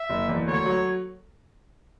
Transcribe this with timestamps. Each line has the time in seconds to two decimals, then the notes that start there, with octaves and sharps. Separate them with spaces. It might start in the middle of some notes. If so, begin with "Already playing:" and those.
Already playing: E5
0.10 F#1
0.29 E2
0.47 D2 C#5
0.65 F#3